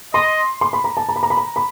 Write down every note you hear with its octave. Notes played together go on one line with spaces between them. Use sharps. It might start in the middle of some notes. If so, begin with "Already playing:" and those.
D#5 C6
C6
B5
A#5
A5
A#5
B5
A#5
B5
A#5
B5